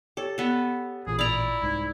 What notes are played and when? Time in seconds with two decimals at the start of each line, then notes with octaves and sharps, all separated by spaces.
0.17 G4 A4 C#5
0.38 B3 A4
1.07 A1 A#2 G#4
1.19 E4 D5 A#5
1.62 C2 G#2